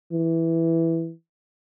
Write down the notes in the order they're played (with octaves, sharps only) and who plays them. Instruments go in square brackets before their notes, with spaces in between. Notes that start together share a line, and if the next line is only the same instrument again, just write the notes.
[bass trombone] E3